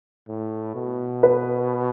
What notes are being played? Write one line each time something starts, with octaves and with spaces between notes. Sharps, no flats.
A2
B2
B4